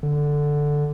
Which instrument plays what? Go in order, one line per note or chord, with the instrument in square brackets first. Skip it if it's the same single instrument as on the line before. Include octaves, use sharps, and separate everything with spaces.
[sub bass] D3